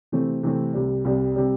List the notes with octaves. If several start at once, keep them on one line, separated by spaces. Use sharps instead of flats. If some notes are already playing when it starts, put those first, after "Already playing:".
C3 E3 A3 C4
C3 E3 A3 C4
C2 C3 G3
C2 C3 G3
C3 G3